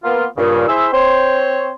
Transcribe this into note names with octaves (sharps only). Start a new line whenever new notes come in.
A#3 B3 F4
G2 A#2 C#3
E4 G#4 C5 E5
C4 C5 C#5